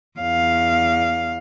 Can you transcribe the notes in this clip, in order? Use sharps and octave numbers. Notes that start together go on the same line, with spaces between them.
E2 F5